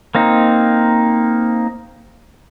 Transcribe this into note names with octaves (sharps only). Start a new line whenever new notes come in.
A#3 C4 D#4